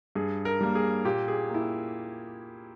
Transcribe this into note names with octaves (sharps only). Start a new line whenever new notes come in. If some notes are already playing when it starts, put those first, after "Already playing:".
G2 G#4
A#4
G3 A#3
G#4
A#2 G4
G#4
A#3 E4